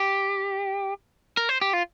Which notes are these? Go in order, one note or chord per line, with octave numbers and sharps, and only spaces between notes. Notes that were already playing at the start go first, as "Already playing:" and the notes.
Already playing: G4
A#4
C5
G4
F4